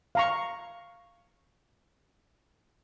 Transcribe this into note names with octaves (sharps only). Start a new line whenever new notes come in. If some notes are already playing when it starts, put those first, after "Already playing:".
F5 A#5 C#6